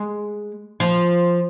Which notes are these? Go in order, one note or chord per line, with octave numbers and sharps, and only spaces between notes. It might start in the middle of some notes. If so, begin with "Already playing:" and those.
Already playing: G#3
F3